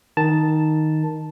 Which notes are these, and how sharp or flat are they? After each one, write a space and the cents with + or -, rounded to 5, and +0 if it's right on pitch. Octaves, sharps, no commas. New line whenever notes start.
D#3 +0 A5 +0